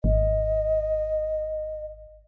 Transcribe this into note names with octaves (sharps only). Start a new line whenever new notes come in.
G#1 D#5